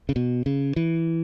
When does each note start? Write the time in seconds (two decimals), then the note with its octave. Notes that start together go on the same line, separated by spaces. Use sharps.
0.09 C#3
0.16 B2
0.46 C#3
0.76 E3